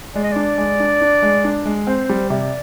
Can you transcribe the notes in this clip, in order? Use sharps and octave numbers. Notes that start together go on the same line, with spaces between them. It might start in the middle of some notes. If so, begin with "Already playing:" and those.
G#3 D5
D#5
D4 D5
G#3
D4
D4
G#3
D4
G#3
C4 C5
G3
C3 D5